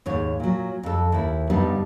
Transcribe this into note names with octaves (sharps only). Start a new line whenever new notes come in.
D#2 G#2 C#5
A#2 F#3
F2 A4
D#2 E4
G2 D3 G3 B3 D#4